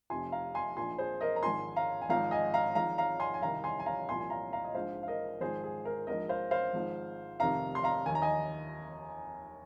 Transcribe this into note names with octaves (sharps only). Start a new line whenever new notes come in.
F1 F2 C3 F3 G#5 C6
F5 A#5
G#5 C6
A#1 A#2 F3 G#5 C6
G#4 C5
A#4 D#5
A#5
G#1 G#2 F3 G#5 C6
F5 A#5
G#5
G#1 G#2 F3 F5 A#5
D#5 G#5
F5 A#5
G#1 G#2 F3 F5 A#5
F5 A#5
G#5 C6
G#5
C2 C3 D#3 F5 A#5
G#5 C6
G#5
F5 A#5
C2 A#2 F3 G#5 C6
G#5
F5 A#5
F5 A#5
D#5
A#1 G#2 F3 C5 F5
F5
A#4 D#5
G#1 G#2 F3 G#4 C5
G#4
A#4
A#1 G#2 F3 A#4 D#5
C5 F5
C5 F5
G#1 G#2 F3
F1 F2 C3 D#3 F5 A#5
C6
F5 A#5
D#2 D#3 G#5
A#5
D#5 G#5